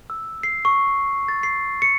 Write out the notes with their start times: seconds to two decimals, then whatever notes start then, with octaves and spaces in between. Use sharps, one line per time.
0.10 E6
0.43 C7
0.65 C#6
1.28 A6
1.43 C7
1.82 C#7